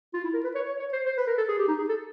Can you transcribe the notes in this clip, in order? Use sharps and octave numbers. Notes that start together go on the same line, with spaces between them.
F4
E4
A#4
B4
C#5
C#5
C#5
C5
C5
B4
A#4
A4
G#4
G4
D#4
G#4
A4